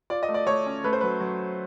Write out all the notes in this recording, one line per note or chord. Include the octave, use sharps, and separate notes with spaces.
F4 D5
D#5
A3
D5
A3 C#5
C#4
A3 B4
C5
F#3 B4
F#3